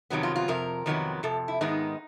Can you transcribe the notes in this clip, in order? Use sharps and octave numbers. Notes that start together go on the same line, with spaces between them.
F2 C3 D#3 F#3 B3
F4
F4
F2 C3 A#4
F2 C3 D#3 F#3 B3
F2 C3 A4
E4
G#2 D#3 G#3 B3 D#4